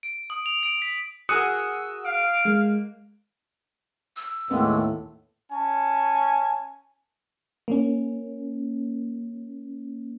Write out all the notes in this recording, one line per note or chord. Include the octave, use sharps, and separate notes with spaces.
D7
D#6
F7
D7
B6
F#4 G#4 A#4 D#6 E6 F#6 C#7
F5 D7
G#3 A#3
E6
D#2 A2 D#3 G#3 A#3 B3
C#4 G#5 A5
A#3 C#4